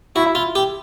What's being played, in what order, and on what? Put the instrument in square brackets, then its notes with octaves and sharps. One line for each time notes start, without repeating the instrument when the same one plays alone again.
[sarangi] E4 [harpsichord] F#4
[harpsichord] F4
G4